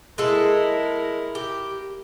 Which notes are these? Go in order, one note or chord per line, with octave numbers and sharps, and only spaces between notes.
G#3 E4 A4 A#4
G4